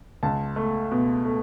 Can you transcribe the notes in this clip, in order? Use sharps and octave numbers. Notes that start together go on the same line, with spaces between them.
C#2 A5
A3
B2
A3